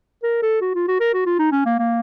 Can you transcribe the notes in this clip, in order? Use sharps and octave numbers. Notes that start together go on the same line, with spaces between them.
A#4
A4
F#4
F4
F#4
A#4
F#4
F4
D#4
C#4
A#3
A#3